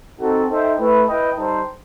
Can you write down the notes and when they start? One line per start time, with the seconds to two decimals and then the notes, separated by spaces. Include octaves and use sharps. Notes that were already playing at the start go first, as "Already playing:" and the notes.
0.20 C4 D#4 F#4 A4
0.49 D#4 A4 C5 E5 G5
0.78 A3 E4 B4
1.07 E4 B4 D#5 G5
1.36 G3 D#4 A4 C5